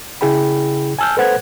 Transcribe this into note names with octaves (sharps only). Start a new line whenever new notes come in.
C#3 E4 G#4 G5 B5
G#5 A5 E6 F6 G6
A4 B4 C5 F#5 F#6 G#6